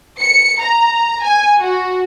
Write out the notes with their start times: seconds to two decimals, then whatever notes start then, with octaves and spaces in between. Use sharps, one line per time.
0.19 C#7
0.60 A#5
1.23 G#5
1.58 F#4